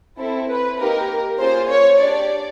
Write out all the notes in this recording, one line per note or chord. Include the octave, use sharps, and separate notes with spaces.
C4 E4 A4
B4
A#3 D#4 G4 A#4
A#3 C#4 F4 G#4 C5
C#5
D4 G4 D5